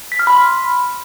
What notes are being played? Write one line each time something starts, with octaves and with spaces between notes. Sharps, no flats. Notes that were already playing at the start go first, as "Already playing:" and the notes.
B6
F6
B5
C6